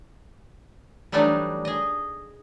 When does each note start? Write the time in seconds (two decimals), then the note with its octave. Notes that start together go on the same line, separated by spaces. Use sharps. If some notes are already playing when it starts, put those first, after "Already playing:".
1.12 E3 F#3 G3 A3 D4 D#4
1.65 G#4 D#5